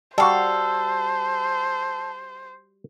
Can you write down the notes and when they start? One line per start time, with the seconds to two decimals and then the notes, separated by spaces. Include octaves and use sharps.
0.18 G3 F#4 A4 C5 F5